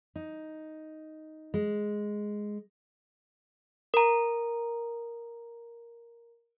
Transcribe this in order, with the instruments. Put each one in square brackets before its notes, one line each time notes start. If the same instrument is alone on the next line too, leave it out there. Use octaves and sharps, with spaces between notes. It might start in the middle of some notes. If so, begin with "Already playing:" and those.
[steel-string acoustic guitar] D#4
G#3
[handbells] A#4 A#5